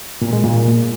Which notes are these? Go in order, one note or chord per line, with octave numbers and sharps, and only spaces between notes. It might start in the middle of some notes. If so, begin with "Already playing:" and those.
A#2
G#3
A#2